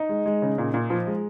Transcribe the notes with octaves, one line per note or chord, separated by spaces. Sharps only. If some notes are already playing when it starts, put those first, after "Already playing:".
Already playing: D#4
G#3
G#3
C#3
A#2
A#2
F3
G#3